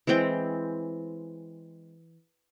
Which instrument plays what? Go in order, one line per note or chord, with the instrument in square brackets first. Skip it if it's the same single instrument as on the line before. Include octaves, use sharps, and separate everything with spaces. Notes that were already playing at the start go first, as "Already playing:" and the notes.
[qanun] E3 G#3 C4 G5